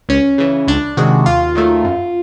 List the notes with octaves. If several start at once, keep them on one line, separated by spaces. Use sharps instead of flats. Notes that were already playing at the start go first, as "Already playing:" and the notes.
C#2 C#4
C#3 E3
C#2 D4
C3 D#3 G#3 F#4
D#2 F4
D#3 F#3 A3
F#2